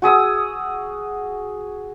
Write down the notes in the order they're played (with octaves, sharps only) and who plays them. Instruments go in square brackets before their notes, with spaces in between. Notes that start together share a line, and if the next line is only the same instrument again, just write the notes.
[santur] F#4 G#4 D#6 E6